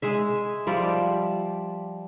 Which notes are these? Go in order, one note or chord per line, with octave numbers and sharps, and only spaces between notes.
G#3 G#4 E5
F3 G3 D5 E5